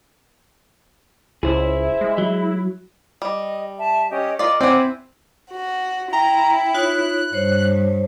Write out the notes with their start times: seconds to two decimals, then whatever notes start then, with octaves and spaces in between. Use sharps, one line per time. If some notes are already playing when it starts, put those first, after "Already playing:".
1.43 C#2 E4 G#4 C5
2.01 G#3
2.18 F#3
3.22 G3 D#5
3.79 E5 A5
4.10 C#4 G4 D#5
4.39 F4 A#4 D5 D#5
4.61 C4 E4 D5 F#5 G#5
5.51 F#4
6.13 E4 G5 A#5
6.74 D#4 F4 C#5 F#6
7.33 G2 C5 C#5